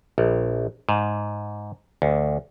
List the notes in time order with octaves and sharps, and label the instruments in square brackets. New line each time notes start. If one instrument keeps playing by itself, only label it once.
[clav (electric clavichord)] A#1
G#2
D2